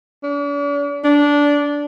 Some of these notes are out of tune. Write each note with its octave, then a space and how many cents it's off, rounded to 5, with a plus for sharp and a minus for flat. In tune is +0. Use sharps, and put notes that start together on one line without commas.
D4 -45
D4 -15